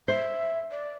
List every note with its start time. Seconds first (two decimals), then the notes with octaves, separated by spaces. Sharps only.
0.08 C5 E5
0.71 D5